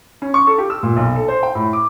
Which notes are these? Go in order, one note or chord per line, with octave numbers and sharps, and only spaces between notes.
C#4
C#6
A4
G4
E6
A#2
B1
A4
C5
G5
A2
D6